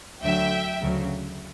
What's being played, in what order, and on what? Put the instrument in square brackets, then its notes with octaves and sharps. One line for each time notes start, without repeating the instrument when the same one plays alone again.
[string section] D2 D3 F#3 E5 G5
D2 C#3 F#3